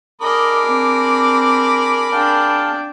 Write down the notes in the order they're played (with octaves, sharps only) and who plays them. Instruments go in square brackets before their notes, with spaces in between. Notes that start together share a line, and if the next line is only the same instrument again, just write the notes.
[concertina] D4 G#4 [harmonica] A#4 B5 D6 [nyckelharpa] D#5
[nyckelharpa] C4
[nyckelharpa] D4 G5 [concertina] G#4 F5 A5